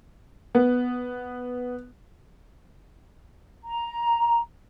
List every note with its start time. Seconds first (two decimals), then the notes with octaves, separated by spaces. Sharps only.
0.55 B3
3.63 A#5